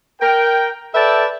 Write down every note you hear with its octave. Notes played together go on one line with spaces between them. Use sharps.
A#4 G5
A4 B4 D5 E5 G5 A5